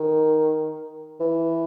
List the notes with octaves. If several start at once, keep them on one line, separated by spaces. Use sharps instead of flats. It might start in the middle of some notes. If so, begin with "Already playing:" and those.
Already playing: D#3
E3